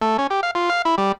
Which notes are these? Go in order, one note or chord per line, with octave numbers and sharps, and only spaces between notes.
A3
C#4
G4
F5
F4
F5
E4
G3